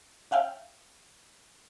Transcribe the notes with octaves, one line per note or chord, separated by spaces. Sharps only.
C#4 E5 F5 G5